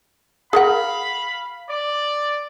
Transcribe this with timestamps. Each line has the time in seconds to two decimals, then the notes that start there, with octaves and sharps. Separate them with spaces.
0.53 G#4 A#4 F5 F#5 B5
1.70 D5